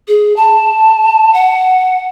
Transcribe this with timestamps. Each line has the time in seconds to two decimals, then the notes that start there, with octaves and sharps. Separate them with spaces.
0.08 G#4
0.36 A5
1.34 F#5